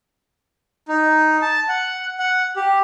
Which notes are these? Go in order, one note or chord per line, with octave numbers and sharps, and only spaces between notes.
D#4
A5
F#5
F#5
G4